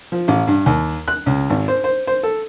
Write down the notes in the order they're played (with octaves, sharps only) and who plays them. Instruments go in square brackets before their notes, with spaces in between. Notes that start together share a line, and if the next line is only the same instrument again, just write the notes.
[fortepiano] F3
A1
G2
D#2
F#6
C#2
G#1
C5
C5
C5
A4